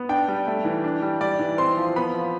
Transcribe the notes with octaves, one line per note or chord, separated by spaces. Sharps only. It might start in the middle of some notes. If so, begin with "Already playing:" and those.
Already playing: B3
D4 G5
G3
A3
E3
D4
G3
G3 D5
E3
C4 C6
F3
B3 B5
F3